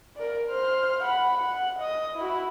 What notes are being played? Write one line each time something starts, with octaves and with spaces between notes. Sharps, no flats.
A#4 D5
C5 F6
F#5 B5
F#5
D#5 D#6
E4 F#4